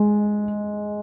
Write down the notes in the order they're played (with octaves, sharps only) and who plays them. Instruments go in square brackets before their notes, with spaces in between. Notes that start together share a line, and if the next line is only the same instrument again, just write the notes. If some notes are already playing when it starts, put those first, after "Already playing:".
Already playing: [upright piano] G#3